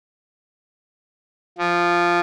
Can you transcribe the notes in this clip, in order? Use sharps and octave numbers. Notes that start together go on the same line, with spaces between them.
F3